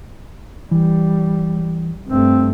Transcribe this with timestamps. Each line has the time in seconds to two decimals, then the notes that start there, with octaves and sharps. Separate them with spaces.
0.71 E3 G3
2.08 G2 A3 C4